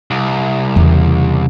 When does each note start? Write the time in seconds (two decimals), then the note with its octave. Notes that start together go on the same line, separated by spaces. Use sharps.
0.11 C2
0.76 E2 C#3